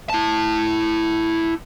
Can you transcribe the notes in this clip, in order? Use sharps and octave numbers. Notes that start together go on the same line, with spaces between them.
E4 A5